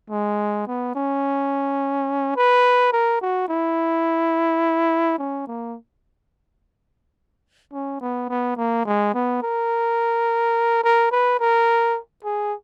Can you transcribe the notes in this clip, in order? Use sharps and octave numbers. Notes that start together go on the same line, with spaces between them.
G#3
B3
C#4
B4
A#4
F#4
E4
C#4
A#3
C#4
B3
B3
A#3
G#3
B3
A#4
A#4
B4
A#4
G#4